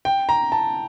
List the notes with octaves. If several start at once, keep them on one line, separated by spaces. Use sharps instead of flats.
G5
A#5
A5